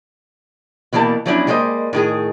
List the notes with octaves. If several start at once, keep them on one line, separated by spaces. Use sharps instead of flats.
B2 E3 G3 A#3 A5
F3 F#3 B3 C#4 D4 E4
G3 G#3 A#3 C5 D#5
A2 D#3 G#4